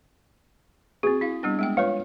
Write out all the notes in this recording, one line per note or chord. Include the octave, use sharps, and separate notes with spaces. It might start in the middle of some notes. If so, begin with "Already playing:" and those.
C4 F#4 G#4
E4 F5
G3 B3 D4
G#3 B3 G5
F4 B4 C#5 F5